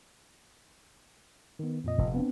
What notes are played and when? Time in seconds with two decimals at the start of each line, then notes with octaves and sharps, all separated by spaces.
1.59 D#3 B3
1.84 F2 A#2 D#5
1.98 F1
2.14 B3 C4 D4